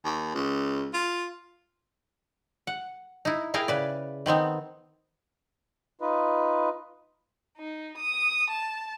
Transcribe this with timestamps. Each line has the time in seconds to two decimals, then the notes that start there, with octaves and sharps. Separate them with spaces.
0.05 D#2
0.34 C#2
0.94 F4
2.67 F#5
3.25 D#4 E4
3.54 E4 G#4 A#4 F5 G5
3.68 C#3 B4 D5
4.26 D#3 B3 C4 D#4
6.01 D#4 F4 B4 D#5
7.57 D#4
7.97 D#6
8.50 A5